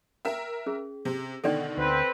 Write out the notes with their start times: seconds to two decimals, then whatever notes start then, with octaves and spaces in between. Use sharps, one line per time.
0.25 A#4 E5 G5 E6
0.66 C#4 G#4
1.05 C3
1.44 B2 D3 D#3 A4 D5 G5
1.77 D2 C4 B4